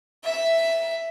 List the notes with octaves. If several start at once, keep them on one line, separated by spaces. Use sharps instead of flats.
E5